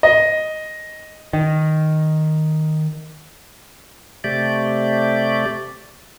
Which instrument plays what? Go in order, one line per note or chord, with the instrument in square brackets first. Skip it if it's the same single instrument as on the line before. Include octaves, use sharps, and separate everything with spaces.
[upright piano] D#5
[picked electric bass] D#3
[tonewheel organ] C3 A3 G4 D5